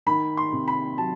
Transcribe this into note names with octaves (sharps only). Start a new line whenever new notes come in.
D#3 B5
C6
C3
B5
F#3 A5